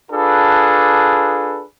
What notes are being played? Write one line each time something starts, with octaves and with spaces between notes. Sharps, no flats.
D4 F4 G#4 A4 B4